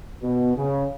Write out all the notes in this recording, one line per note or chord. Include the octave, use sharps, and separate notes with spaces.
B2
C#3